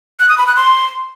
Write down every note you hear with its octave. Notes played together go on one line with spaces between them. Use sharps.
F#6
D#6
B5
F#6
C6